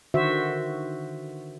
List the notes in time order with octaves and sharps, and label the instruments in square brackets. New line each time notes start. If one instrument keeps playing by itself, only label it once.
[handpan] D3 D#3 F#4 C5 E5